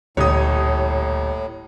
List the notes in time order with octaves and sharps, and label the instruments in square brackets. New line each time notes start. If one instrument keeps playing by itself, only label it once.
[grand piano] D#1 A1 [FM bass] D2 [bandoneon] A2 [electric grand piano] C#5 D#6